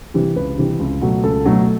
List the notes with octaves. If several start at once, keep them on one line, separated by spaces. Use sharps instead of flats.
C3 E3 G3
C#2 B4
C3 E3 G3
C#2
B2 F#3 A3
C#2 A4
B2 F#3 A3